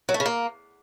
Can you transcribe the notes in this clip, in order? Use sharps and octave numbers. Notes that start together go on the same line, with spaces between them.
F#3
A3
C#3
A#3